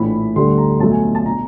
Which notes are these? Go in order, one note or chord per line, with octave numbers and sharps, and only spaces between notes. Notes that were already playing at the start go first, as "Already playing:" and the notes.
Already playing: A#1 A2 E3 B5
D2 D3 G3 C6
A#5
B1 B2 F#3 A3 A5
G#5
A5
B2 A#5